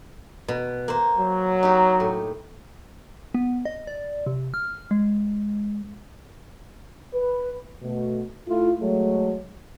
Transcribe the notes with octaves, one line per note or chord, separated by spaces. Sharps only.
B2
A#3 C5
F#3
D#4 G4
A2
B3
D#5
D5
C3
F6
G#3
B4
B2 A3
A3 E4 F4
F#3 G#3 A3